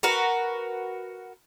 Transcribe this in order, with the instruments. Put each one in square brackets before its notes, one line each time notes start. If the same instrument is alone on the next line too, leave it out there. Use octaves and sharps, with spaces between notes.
[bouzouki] F#4 A#4 B4